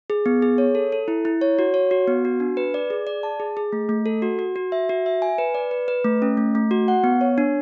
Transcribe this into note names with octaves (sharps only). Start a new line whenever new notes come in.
G#4
B3
G#4
C#5
A4
A4
E4
E4
C#5
F#4
C#5
F#4
B3
F#4
D4
B4
D5
G#4
D5
A5
G#4
G#4
A3
A3
A4
F#4
F#4
F#4
E5
F#4
E5
G#5
B4
D5
B4
B4
A3
C#4
A3
A3
F#4
F#5
B3
C#5
D4